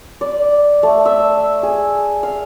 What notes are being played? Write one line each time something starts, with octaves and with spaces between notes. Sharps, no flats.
D5
A3
E5
G#4
F5